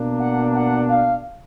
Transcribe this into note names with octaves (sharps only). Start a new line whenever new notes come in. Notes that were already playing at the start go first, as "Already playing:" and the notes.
Already playing: B2 A#3 D4
F#5
F#5
F5